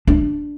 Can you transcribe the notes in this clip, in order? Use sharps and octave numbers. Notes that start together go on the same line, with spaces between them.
D4